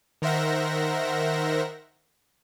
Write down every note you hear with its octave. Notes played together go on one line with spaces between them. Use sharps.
D#3 A#4 C5 E5 F#5 A#6